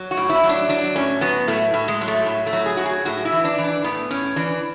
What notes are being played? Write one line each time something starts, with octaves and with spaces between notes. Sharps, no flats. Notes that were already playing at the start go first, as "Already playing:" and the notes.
Already playing: F#3
F#4
A2
E4
F#3
D4
F#3 D4
A2 C#4
F#3 B3
A2 A3
A2
G#3
F#3
A3
A2
A3
F#3
G#4
A2 F#4
G#4
A2 F#4
E4
E3
D4
E3
D4
A2 B3
A2 C#4
E3 D4